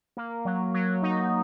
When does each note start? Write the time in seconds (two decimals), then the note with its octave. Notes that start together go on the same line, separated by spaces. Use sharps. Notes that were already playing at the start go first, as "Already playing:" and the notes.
0.17 A#3
0.45 F#3
0.74 F#3
1.03 D#4